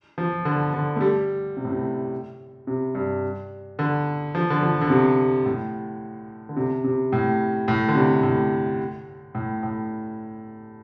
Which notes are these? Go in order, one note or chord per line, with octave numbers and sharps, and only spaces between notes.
F3
D3
D3
A3
G3
C3
A2
C3
C3
G2
D3
F3
D3
F3
D3
C3
A2
D3
C3
C3
A2
A2
D3
C3
A2
A2
A2